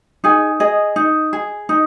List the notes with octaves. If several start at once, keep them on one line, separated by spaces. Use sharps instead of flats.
D#4 G#4 G#5
G#4 D#5
D#4
G#4
D#4